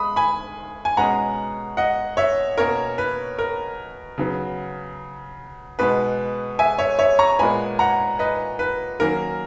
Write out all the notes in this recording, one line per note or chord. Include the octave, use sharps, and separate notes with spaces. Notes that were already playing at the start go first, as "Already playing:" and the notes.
Already playing: G#3 B5 D#6
G#5 B5
G#5
B2 G#3 C#4 F#5 A#5
D#5 F#5
C#5 E5
B2 A#3 C#4 A#4 C#5
B4
A#4
C#3 F#3 B3
B2 G#3 B3 B4
E5 G#5
C#5 E5
C#5 E5
A#5 C#6
A#2 G#3 B3 G#5 B5
F#5 A#5
B4 D#5
B4
D#3 F#3 A#3 C#4 A#4